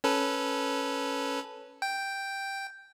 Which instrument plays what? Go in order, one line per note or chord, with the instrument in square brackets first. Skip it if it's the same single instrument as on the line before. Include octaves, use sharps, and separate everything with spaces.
[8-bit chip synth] C#4 A4 B4
G5